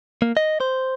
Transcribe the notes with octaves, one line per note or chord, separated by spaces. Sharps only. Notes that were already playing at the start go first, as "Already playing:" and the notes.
A#3
D#5
C5